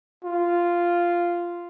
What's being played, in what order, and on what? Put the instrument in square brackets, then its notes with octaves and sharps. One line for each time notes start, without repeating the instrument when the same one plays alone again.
[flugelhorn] F4